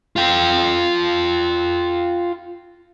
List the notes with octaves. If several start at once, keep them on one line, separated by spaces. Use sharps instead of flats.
F4 G5